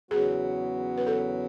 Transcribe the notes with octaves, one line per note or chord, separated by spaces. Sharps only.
E2 C#3 F#3 B3 F#4 G#4
B4
A4